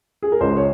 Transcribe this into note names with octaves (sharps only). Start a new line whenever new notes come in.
G#4
A#4
C#2 C5
C#5